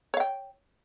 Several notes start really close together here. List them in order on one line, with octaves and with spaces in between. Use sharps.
C#5 F5 G5